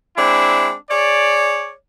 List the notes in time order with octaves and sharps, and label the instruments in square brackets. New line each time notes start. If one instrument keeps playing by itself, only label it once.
[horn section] G#3 C4 D4 E4
G#4 C#5 D5